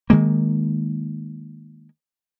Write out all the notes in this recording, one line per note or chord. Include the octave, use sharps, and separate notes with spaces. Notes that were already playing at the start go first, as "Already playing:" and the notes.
D#3 G#3 A#3